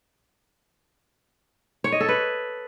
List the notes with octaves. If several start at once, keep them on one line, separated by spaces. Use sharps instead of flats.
C#5
D#5
A4
B4